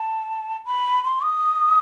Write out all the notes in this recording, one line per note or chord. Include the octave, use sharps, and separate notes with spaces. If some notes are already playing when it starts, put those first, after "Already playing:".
Already playing: A5
B5
C6
D#6